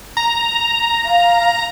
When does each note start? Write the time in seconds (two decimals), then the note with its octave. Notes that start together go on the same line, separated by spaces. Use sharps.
0.17 A#5
1.05 F5